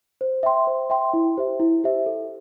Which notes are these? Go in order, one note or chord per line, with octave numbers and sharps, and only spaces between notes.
C5
E5 G5 C6
C5
E5 G5 C6
E4
G4 C5 E5
E4
G4 C5 E5
A4